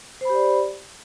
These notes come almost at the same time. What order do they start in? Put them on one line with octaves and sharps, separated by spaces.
C5 B5 G4 D5